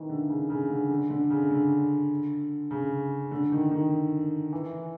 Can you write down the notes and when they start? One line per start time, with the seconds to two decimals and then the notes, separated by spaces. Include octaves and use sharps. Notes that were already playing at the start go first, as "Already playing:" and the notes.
Already playing: D#3 E3
0.09 D3
0.29 C#3
0.50 C#3
0.70 D3
0.90 D3
1.10 D3
1.30 C#3
1.51 D3
2.71 C#3
3.31 D3
3.52 D#3
3.71 D#3
4.53 E3